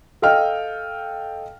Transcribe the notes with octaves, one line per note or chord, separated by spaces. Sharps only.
A4 D#5 F5 G5 F6